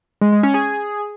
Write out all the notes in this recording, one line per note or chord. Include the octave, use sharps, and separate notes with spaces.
G#3
G#3
C#4
G#4